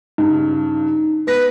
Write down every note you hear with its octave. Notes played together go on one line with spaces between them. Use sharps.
G2 C#3 D#4
B3 B4 A#6